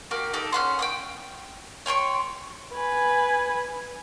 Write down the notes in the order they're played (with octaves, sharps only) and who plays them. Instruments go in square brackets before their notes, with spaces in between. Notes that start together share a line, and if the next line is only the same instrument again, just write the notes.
[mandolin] A#3 F#4 G4
D#4 G4 A4
C#4 F#5 C6
G5 C#6 D#6
C#5 G5 C6 C#6
[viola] B4 G#5